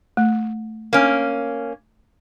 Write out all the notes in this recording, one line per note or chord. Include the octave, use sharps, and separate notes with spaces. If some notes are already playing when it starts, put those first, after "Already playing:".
A3
A#3 C#4